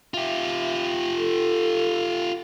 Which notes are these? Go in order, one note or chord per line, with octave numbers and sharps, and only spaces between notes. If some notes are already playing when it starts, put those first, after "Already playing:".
F4 G4 E5
A4